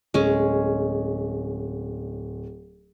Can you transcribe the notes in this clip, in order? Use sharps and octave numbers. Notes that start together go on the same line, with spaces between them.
D1 G#3 C#4